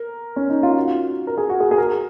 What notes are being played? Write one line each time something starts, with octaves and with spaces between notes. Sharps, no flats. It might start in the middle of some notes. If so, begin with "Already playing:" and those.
Already playing: A#4
C#4
D#4
F4
F#4
A#4
G#4
F#4
G#4
G#4
A#4